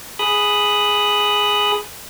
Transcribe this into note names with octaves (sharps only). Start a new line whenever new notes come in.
G#4 B5 D#6 F#6